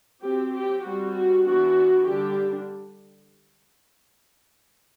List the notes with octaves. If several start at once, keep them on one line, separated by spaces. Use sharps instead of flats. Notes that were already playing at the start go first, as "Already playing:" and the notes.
F#3 C4 G4
G4
G3 C4 F#4
F#4
E3 B3 D4 F#4
D3 G3 D4 G4